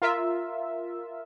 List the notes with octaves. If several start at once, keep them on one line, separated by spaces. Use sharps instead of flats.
F4 A#4 E5